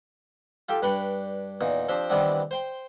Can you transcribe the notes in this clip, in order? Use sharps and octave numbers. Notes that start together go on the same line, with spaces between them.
F4 G4 A4 G5
G2 D4 B4 G5 B5 C#6
E2 A#2 D#4
F3 C4 D4 G4 C5
D#3 E3 G3 B3 C4 D4
C5 G5 C6